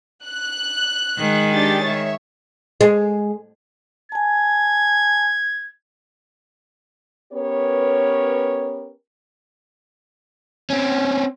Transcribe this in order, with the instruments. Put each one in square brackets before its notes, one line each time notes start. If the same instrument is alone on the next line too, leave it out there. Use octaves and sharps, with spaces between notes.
[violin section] F#6
[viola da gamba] D#3 G#3
[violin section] D4 G4 A6
C#5 E5
[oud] G#3
[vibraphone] G#5 A5 [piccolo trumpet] G#6
[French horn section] B3 C#4 G4 A#4 B4 C#5
[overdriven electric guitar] C4 C#4